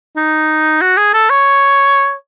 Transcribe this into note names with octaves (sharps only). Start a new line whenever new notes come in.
D#4
F#4
G#4
A4
C#5